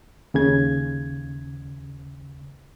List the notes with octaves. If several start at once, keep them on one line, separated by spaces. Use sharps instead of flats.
D#2 C#3 G#6